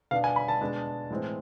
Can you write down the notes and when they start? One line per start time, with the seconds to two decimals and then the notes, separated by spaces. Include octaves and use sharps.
0.11 B2 B3 D4 F5
0.24 G#5
0.36 B5
0.48 A5
0.61 B2 G#3 D4
1.10 A2 E3 G#3 C4